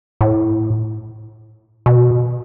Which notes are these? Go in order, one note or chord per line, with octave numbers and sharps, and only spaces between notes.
A2
B2